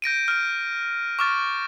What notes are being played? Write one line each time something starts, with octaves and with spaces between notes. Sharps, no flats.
G6 A#6 D7 D#7
F6 D#7
C#6 D6 F6 A6